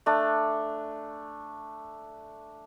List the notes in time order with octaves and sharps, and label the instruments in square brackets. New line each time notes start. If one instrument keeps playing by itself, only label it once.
[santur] A3 D4